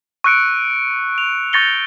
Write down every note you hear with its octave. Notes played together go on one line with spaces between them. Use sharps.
C#6 E6 F#6 C#7 D7
F7
C#6 G6 A6 A#6 C#7 G7